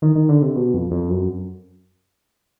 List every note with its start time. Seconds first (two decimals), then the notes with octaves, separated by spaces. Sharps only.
0.02 D#3
0.16 D#3
0.29 D3
0.42 C3
0.56 B2
0.74 F2
0.91 F2
1.09 F#2